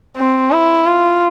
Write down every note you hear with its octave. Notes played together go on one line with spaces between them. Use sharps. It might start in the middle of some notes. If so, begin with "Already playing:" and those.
C4
E4
F4